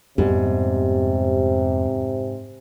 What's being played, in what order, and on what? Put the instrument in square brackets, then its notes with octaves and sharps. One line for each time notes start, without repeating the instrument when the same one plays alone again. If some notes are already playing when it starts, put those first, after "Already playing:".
[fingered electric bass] F2 G#3 B3 [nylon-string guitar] G#2 [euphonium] C3 [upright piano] G3